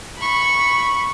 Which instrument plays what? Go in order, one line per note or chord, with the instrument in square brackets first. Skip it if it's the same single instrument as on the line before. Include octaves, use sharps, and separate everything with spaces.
[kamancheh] B5 C#6